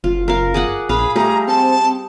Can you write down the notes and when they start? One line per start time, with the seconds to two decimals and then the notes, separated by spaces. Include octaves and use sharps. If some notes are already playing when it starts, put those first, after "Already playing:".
0.04 F#1 F4
0.28 A#4 F5
0.54 G#4 D5 F#5
0.89 A#1 G#4 F5 B5
1.16 G3 A3 G#4 A#5
1.48 C4 A5